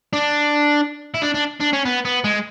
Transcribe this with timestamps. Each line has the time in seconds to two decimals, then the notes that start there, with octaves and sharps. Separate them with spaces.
0.13 D4
1.14 E4
1.22 D4
1.34 D4
1.61 D4
1.73 C#4
1.86 B3
2.05 B3
2.24 G#3